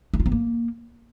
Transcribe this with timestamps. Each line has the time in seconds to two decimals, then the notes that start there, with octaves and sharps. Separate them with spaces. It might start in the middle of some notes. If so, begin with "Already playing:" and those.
0.14 D4
0.20 F4
0.26 C4
0.32 A#3